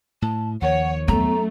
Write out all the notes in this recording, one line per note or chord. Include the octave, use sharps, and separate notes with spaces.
A2 A5
D#2 D#3 F3 C#5 F#5
F#2 A3 B3 A#5